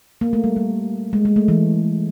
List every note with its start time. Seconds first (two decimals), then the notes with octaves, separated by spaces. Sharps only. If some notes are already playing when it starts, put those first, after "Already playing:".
0.21 A#3
0.33 A3
0.44 G3
0.56 G3
1.13 G#3
1.25 G#3
1.36 A3
1.48 E3